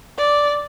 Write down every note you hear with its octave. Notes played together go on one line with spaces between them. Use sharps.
D5